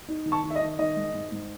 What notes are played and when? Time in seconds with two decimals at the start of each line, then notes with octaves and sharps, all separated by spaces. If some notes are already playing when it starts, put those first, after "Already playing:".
0.08 D#4
0.26 D#3
0.32 A5 C#6
0.44 D#3
0.50 E5
0.55 D#5
0.61 D#3
0.79 D#3 D#5
0.96 G#3
1.14 G#2
1.32 G#2